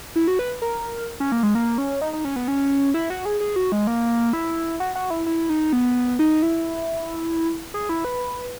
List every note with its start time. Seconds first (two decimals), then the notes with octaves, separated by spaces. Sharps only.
0.16 E4
0.28 F#4
0.39 B4
0.62 A#4
1.20 C#4
1.32 A#3
1.43 G#3
1.55 A#3
1.78 C#4
2.01 D#4
2.13 D#4
2.25 C#4
2.36 B3
2.48 C#4
2.94 E4
3.10 F#4
3.25 G#4
3.41 G#4
3.56 F#4
3.72 G#3
3.87 A#3
4.33 E4
4.80 F#4
4.95 F#4
5.10 E4
5.26 E4
5.49 D#4
5.73 B3
6.19 D#4
6.42 E4
7.74 G#4
7.89 E4
8.05 B4